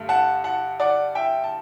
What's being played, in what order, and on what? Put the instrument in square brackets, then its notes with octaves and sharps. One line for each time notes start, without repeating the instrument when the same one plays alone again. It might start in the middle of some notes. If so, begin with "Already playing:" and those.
Already playing: [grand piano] G2 D3 A3
F#5 A5
F#5 A5
D5 F#5
E5 G5
A5